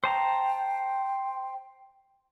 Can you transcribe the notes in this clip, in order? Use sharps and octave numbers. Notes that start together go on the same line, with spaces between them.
C5 G5 A5 A#5